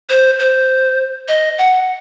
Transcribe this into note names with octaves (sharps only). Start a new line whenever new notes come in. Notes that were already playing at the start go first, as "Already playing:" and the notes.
C5
C5
D#5
F#5